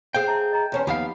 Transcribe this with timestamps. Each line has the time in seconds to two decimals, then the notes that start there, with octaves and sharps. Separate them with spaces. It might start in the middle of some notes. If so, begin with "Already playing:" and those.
0.15 G#4 C5 F5 G5
0.28 E5 A5 A#5
0.53 D#5 A#5
0.72 E2 C#4 C5 F5 A5
0.87 D#2 F3 B3 D#4 G4 F5 B5